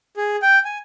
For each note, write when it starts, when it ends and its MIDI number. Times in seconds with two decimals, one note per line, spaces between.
0.17 0.36 68
0.42 0.59 79
0.65 0.78 80